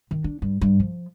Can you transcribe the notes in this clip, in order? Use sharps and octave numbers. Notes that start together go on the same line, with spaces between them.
D#3
D4
G2
G2
F3